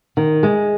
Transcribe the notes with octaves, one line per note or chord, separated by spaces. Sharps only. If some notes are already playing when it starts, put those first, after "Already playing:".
D#3
G#3